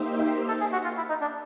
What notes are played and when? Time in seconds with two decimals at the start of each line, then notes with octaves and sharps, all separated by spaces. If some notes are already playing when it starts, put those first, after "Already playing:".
Already playing: A#3 D#4 G4 C5 E5
0.48 A4
0.60 G#4
0.73 F#4
0.84 F4
0.97 E4
1.09 D#4
1.21 D4